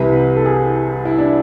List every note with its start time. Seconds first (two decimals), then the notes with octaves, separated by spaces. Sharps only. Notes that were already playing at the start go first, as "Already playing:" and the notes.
Already playing: C2 C3 E3 B4
0.36 A4
0.45 G#4
1.05 E4
1.18 D4